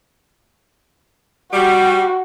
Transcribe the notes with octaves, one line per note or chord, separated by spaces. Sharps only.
G3 F#4